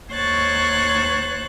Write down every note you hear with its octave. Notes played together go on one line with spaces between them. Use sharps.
D#2 C5 C#5 C#6 F#6 A6